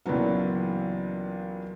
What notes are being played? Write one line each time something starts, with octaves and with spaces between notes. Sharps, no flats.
C#2 A#2 E3 F#3 B3